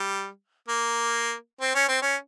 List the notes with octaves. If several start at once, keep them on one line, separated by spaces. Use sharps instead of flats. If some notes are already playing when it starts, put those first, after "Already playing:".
Already playing: G3
A#3
C4
C#4
C4
C#4